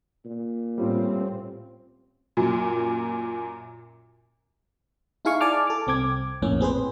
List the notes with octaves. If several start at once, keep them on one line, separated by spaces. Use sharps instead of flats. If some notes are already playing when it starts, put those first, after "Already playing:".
A#2
A2 G3 C4 C#4 F4
F#2 A#2
D#4 E4 G#4 F5 G#5 C#6
D5 G#5 A5 D6 F6
A4 D6
C2 C4 D6 G#6
A#1 F2 A2 A#3 C#4
C4 G#4 B4 C5